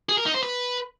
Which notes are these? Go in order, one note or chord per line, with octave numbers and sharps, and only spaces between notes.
G#4
A#4
D#4
C5
B4